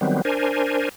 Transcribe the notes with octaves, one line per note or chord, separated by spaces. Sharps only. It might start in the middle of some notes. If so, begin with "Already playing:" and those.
D#3 F#3 G3 B3 C4
D4 A#4 C5 G#5